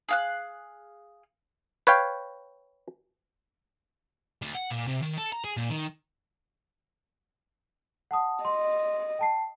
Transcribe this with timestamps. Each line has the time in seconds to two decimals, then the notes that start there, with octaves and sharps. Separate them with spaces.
0.09 G#4 F5 F#6
1.87 B4 C#5 F5 G5
4.42 D2
4.55 F#5
4.71 A#2
4.87 C3
5.02 D#3
5.18 A4
5.32 A#5
5.44 G#4
5.57 A#2
5.70 D#3
8.11 F#5 A5 D#6
8.45 D#5 C6
9.19 G5 A5 C7